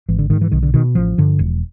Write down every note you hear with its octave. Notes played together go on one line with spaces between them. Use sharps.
G#1 E3
D3
G#2 D#3
E3
B1 D#3
D3
B2 D#3
A1 F3
G2 D3
E1